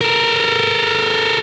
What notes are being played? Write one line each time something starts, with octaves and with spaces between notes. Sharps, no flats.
A4 A#4